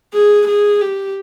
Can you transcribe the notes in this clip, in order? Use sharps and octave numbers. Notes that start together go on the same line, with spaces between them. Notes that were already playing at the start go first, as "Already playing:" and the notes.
G#4
G#4
G4